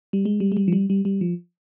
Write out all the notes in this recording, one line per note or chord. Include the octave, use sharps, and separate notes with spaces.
G3
G#3
G3
G#3
G3
F3
G3
G3
G3
F3